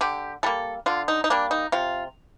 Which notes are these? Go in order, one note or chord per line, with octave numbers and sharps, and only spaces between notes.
D3 G4
G3 A#3 A4
D3 F4
D#4
D#4
G3 A#3 D4
D#4
C3 F4